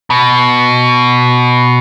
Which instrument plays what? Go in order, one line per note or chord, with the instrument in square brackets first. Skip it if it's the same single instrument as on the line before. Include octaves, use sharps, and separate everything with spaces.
[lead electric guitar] B2